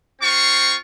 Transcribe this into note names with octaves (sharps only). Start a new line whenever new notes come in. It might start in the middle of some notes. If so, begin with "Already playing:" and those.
C4 F4 C#6